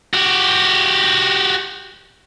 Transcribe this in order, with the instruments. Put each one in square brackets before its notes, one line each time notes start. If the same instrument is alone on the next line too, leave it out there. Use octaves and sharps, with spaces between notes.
[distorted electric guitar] F#4 G4